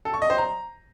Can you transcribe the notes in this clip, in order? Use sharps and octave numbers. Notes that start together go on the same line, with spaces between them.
A4
C#6
D#5
C5
A#5